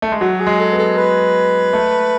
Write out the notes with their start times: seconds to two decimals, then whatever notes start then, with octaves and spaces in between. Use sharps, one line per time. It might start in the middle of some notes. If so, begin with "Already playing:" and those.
0.02 A3
0.12 G#3
0.21 F#3 F#4
0.40 G#4
0.47 G#3
0.59 A4
0.72 B3
0.78 A4
0.98 B4
1.73 A3